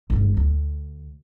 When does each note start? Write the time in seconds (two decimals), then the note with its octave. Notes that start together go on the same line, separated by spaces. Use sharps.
0.10 G1 G#2
0.37 D2